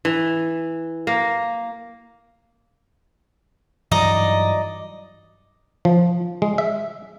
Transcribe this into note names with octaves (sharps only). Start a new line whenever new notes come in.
E3
A#3
G2 E3 F#3 D#4 D5 D#5
F3
G#3
E5